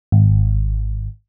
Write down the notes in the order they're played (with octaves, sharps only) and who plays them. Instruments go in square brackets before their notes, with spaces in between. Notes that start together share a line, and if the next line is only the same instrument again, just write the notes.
[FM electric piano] G#1